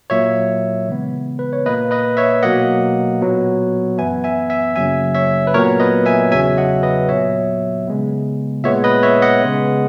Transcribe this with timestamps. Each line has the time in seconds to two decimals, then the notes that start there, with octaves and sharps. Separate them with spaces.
0.10 A#2 F#3 A#3 C#5 E5
0.88 C#3 E3 G#3 B3
1.39 B4
1.53 C#5
1.66 A#2 A#3 B4 D#5
1.91 B4 D#5
2.17 C#5 E5
2.43 B2 F#3 A#3 D#5 F#5
3.21 A#2 F#3 B3
3.98 F#2 E3 B3 E5 G#5
4.24 E5 G#5
4.50 E5 G#5
4.76 F#2 C#3 F#3 A#3 E5 G#5
5.15 C#5 E5
5.47 B4
5.54 A#2 F#3 B3 A#4 C#5
5.80 B4 D#5
6.06 E5 G#5
6.31 E2 C#3 F#3 E5 G#5
6.58 D#5 F#5
6.83 B4 D#5
7.09 A#2 F#3 B3 C#5 E5
7.87 C#3 G#3 B3
8.64 A#2 G#3 B3 C#5 E5
8.84 B4 D#5
9.03 C#5 E5
9.22 D#5 F#5
9.42 C#3 G#3 B3